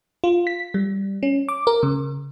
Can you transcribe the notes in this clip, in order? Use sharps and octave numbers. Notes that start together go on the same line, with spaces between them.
F4
B6
G3
C#4
D6
A#4
C#3